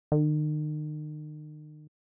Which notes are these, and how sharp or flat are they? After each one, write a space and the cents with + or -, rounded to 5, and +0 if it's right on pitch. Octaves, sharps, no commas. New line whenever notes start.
D#3 -40